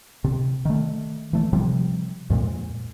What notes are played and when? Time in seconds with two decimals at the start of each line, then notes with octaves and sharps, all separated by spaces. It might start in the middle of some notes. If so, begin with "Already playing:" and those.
0.24 C3
0.65 D#3 A3
1.33 E3 A3
1.53 C3 F3 G3
2.30 F2 A#2 G#3